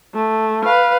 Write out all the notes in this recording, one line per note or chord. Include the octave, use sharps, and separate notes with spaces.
A3
B4 F5